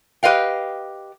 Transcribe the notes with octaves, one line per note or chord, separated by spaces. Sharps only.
G4 B4 D#5 F5 G5